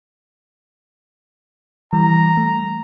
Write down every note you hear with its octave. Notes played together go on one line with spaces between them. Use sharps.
E3 G3 A#5
A3